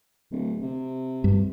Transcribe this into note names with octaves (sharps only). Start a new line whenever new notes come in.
D1
C3
G2